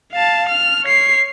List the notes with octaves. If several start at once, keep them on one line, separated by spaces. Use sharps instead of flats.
F5 A5
F6
C#5 C7